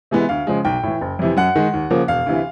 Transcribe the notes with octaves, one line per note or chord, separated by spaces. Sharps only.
C3 E3 G#3 B3
D2 F5
C#3 F3 G#3
B1 G5
A2 E3
F#1
F2 C3 E3
F#2 F#5
D#3 G#3
D#2
C#3 F3 A#3
E1 F5
D2 C3 E3